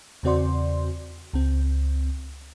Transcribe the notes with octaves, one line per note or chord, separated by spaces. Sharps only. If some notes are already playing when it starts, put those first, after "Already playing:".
E2 C#3 C4 F#4 D5 C6
C#2 C4